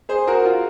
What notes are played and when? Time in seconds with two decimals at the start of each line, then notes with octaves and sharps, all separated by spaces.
0.09 G#4 C5
0.27 F#4 A#4
0.45 F4